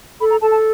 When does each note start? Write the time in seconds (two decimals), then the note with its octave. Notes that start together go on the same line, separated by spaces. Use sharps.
0.20 A4 B5
0.30 A#5
0.41 A4 A5
0.52 A5